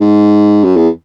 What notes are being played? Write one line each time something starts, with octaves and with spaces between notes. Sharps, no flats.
G#2
F#2
E2